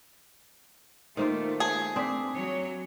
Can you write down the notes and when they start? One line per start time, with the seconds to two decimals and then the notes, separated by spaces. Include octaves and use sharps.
1.17 D#3 A3 A#3 F4 A#4 C5
1.60 G#4 A5
1.96 C4 D4 D#6 B6
2.35 F#3 C#5